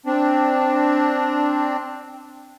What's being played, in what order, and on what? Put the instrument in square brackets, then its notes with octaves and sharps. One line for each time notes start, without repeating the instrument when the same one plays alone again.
[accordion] C4 D4